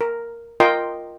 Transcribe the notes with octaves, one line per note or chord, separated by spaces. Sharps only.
A#4
F4 A#4 D#5 G5 C6